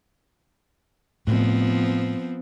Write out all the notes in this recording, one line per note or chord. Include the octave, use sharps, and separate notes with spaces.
A2 F3 B3 C4